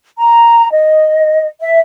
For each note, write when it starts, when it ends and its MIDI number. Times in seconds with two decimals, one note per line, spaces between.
0.17 0.71 82
0.71 1.47 75
1.61 1.78 76